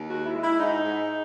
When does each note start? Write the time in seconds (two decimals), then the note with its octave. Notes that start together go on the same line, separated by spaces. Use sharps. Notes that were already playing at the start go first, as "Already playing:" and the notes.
Already playing: D#2
0.09 G#3 F#4
0.26 E4
0.34 G#3
0.43 E4
0.59 G#2 D#4
0.84 G#2